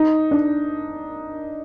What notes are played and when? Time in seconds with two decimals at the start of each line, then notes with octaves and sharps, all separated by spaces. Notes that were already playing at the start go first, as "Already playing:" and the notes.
Already playing: D#4
0.31 D4